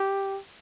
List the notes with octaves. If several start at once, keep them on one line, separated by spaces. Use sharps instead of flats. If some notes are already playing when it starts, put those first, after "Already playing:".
Already playing: G4